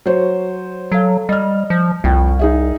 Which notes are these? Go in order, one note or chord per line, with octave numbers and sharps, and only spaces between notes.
F#3 C5 C#5
F#3 A4 F5
G3 D#5 F6
F3
C2 F2 G5
D#4 G#4 E5